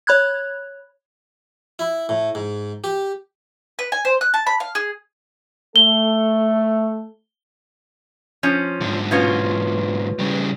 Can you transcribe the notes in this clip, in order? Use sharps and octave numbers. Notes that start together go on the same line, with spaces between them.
C#5 B5 F#6 G#6
E4
A2
G#2
G4
B4
G#5
C5
F#6
A5
B5
F5
G#4
A3 A4 G7
F3 C#4
G#2 D3
B2 C#4 E4 F4 B4
C#3 G3